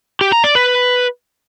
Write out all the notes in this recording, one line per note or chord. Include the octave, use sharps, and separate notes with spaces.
G4
A#5
D5
B4